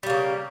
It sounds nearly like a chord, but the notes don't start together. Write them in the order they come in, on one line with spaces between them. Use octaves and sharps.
G3 A#3 C#3